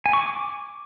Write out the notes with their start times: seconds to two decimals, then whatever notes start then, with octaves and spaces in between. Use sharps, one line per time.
0.06 G#5
0.13 C#6
0.21 D6